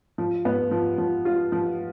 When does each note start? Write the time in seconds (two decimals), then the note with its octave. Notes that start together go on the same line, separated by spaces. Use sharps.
0.18 F3
0.45 B3
0.71 F3
0.98 F3
1.25 F4
1.52 F3